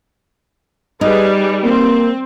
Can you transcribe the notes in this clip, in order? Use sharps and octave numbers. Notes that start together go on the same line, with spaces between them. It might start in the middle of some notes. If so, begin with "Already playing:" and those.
G3 D#4 G#4 B4
A#3 C4